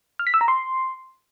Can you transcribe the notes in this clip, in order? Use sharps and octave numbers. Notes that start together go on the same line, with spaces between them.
F6
B6
E6
A#5
C6